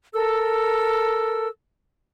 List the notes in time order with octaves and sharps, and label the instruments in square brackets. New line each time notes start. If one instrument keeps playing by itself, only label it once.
[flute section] A4 A#4 E6